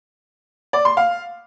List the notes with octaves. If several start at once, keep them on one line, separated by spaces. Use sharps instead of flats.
D5
C6
F5